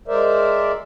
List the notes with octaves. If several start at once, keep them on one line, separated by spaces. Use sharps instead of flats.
G#3 A#4 C5 D5 E5